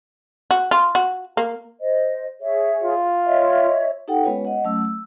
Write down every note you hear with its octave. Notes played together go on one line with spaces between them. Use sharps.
F#4
F4
F#4
A#3
C5 D#5
G#4 C#5 E5
F4
C#5 D#5 E5
D#4 G4 A4 F#5 G5
G#3 B3 C#4 F4 B4 C#5
D#5 F#5
F#3 A3 C#4 E6
E6